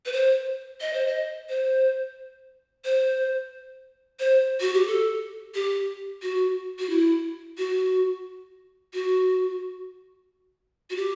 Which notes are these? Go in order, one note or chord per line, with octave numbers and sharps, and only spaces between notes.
B4
C5
D#5
C5
D#5
C5
C5
C5
F#4
G4
A4
G4
F#4
F#4
E4
F#4
F#4
F#4
G4